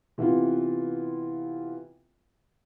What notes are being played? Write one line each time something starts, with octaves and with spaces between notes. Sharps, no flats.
C3 E3 B3 E4 F4